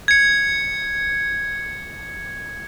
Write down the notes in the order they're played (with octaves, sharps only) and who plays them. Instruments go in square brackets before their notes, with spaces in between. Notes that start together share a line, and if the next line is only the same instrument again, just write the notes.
[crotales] G#6 C#7